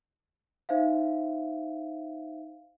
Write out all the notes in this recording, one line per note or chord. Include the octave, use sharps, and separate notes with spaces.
D#4 C5 E5 F5